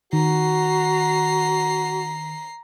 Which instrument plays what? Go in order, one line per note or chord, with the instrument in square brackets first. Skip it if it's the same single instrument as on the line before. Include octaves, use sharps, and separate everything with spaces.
[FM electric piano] D#3 [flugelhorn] F#4 [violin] A#5 C7